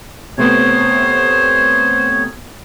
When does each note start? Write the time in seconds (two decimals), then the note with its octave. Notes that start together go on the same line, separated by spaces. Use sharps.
0.38 C3 A3 B3 C5 C#5